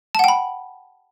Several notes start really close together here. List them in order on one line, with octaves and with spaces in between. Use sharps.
A5 F#5 G5 B5